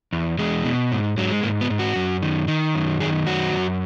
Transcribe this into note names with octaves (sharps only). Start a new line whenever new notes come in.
E2
E2 G#3
B2
G#2
G#2 F#3
G#3
G#2 A#3
B3
G#2
F#4
F#2
D#3
D#3
F#2
D#3 G#4
F#2 F#4
F#2